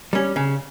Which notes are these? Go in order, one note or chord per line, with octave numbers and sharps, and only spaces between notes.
G3 C#4
C#3